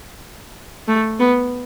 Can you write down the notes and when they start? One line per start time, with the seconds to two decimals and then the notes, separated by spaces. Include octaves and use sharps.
0.88 A3
1.19 B3